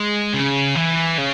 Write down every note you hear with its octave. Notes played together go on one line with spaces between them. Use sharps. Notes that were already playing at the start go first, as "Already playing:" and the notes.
Already playing: G#3
C#3
E3
C#3